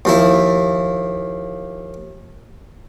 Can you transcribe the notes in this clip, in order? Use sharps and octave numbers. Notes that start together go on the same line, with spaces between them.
D#2 F3 E4